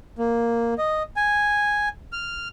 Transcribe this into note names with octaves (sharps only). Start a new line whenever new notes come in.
A#3
D#5
G#5
F6